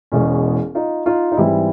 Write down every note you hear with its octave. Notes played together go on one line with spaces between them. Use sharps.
E1 E2 B2 G#3 C#4
D#4 F4
D#4 F4
D#4
G#2 E3 G3 C4 E4